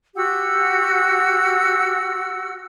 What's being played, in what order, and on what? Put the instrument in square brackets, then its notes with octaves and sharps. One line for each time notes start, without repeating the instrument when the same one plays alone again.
[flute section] F#4 G4 F#5 E6